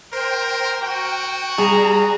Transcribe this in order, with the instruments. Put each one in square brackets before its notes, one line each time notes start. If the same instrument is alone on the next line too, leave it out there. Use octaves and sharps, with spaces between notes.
[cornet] A#4 [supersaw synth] C5 G5
[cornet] F#4 [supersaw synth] G5
[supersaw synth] G3 [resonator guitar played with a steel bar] G#4 [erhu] A#5